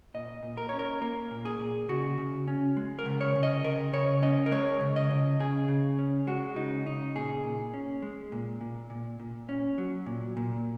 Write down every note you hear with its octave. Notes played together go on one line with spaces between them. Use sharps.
A#2 D#5
A#2
A#4
C#4 C#5
A#4
A#3 A#4
A#2
G#4
A#2
C#3 F#4
C#3
C#4
G#3
A#4
C#3
C#5
C#3
D#5
C#3 A#4
C#3 C#5
C#4 D#5
A#4
G#3 C#5
C#3
D#5
C#3
C#3 G#4
C#3
C#4
G#3 F#4
C#3 D#4
C#3 D#4
A#2 G#4
A#2
C#4
G#3
A#2
A#2
A#2
A#2
C#4
F#3
A#2
A#2